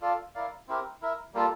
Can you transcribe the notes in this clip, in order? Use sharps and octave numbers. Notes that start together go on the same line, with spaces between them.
F4 A4 D5 F5
E4 A#4 D5 F5
C4 E4 G4 A#4
E4 A#4 E5
G3 A#3 F4 A4